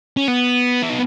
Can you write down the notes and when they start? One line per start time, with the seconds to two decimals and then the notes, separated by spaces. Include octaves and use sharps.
0.17 C#4
0.28 B3
0.83 E4
0.90 D#4